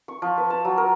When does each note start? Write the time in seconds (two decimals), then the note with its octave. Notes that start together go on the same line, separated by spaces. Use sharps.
0.08 C#6
0.22 F3
0.38 B4
0.50 A5
0.65 F#3
0.78 A#4